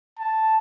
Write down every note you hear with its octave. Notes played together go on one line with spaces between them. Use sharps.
A5